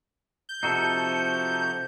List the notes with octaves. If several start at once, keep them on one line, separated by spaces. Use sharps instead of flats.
G6
C3 F3 D#4 F#4 A4